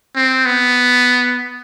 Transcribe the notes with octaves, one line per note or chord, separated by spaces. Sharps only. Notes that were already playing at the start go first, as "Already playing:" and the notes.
C4
B3